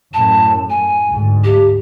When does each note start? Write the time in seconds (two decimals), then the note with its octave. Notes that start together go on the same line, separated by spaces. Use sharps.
0.14 F#2 A2 A5
0.70 G#5
1.10 D2 G#2
1.44 G4